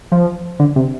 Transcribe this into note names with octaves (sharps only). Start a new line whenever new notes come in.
F3
D3
C3